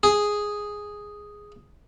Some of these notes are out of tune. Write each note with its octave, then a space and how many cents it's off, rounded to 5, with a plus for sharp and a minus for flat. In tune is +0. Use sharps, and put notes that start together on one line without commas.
G#4 +0